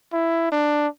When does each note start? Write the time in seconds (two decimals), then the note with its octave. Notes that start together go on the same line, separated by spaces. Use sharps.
0.13 E4
0.52 D4